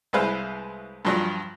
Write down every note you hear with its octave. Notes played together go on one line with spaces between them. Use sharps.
C2 G#3 E4 B4 C5 F5
G2 F3 F#3